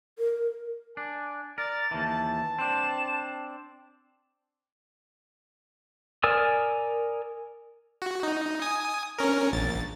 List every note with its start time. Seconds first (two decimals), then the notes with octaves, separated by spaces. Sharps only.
0.19 A#4
0.97 D4 G#5
1.58 A#4 D5 A6
1.91 D#2 E3 A5
2.58 C4 D4 E7
6.24 A#4 D5 G#5 D#6 E6
8.02 F#4
8.23 D#4
8.62 G#5 D#6
9.19 C#4 A#4
9.52 A#1 A6